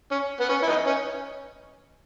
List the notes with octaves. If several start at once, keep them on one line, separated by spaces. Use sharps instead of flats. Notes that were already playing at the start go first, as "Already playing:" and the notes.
C#4
B3
C#4
E4
B3 D#4
C#4